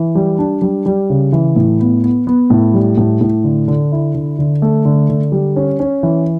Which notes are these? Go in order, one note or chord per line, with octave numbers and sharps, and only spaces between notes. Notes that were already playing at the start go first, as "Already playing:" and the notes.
Already playing: E3
G3
D4
G3
G3
C#3
E3
A2
B3
B3
B3
A2
G3
A2
A2
D3
D3
E4
D3
D3
A3
D3
D3
G3
C#4
C#4
E3